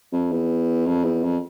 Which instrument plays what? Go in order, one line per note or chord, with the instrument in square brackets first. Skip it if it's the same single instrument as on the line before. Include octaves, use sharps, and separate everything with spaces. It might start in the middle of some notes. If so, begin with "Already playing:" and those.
[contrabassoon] F2
E2
F2
E2
F2